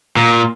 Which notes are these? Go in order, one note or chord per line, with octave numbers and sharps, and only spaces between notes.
A#2